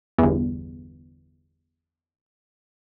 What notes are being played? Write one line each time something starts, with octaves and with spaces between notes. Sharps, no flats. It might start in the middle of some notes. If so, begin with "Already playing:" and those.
G1 E2